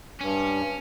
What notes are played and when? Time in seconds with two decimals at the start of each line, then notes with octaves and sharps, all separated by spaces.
0.21 G2 C#4